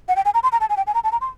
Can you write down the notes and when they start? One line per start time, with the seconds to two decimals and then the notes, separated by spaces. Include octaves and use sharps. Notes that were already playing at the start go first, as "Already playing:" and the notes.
0.08 F#5
0.16 G5
0.25 G#5
0.34 A#5
0.43 C6
0.52 A#5
0.61 A5
0.69 G#5
0.77 G5
0.87 G#5
0.94 A#5
1.04 A5
1.12 A#5
1.21 C6